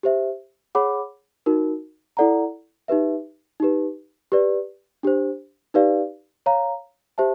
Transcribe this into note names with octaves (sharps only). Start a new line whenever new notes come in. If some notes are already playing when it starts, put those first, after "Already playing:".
G4 C5 E5
G#4 C#5 F#5 B5 D6
D#4 F#4 A#4
E4 A4 D5 F#5 A#5
D#4 G4 B4 E5
D#4 G4 B4
G4 B4 D5
D4 G4 C5
D#4 G4 B4 D5 F5
C#5 F5 A#5
G4 C5 E5 A5